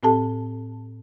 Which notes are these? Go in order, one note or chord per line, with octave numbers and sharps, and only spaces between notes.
A2 C4 G4 A4 A5